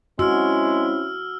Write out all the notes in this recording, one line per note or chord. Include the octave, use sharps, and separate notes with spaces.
G#3 C4 C#4 E4 F#4 E6 F6